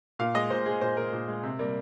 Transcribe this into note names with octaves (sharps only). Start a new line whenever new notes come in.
A#2 F5
G#3 D#5
A#2 C5
G#3 G#4
A#2 C5
G#3 A#4
A#2
G#3
C3
G3 A#3